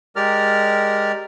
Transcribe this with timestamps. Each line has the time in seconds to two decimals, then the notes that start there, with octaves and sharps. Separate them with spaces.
0.16 G#3 G4 A#4 D5 F6